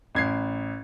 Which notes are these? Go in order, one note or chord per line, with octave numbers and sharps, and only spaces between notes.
A1 G#6 C7